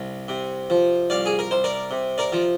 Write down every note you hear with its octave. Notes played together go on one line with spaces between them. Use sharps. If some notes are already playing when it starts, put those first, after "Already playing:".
Already playing: C2
C3
F3
C2 D5 F5
G#4
A#4
C2 C5
A#4 D5
C3
A#4 D5
F3